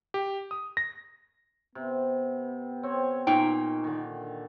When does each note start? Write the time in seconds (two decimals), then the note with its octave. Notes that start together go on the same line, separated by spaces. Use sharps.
0.14 G4
0.51 D#6
0.77 A#6
1.75 C3 B3
2.83 C4 C#5
3.27 A#2 C#4 D#4 G5
3.84 D3 D#3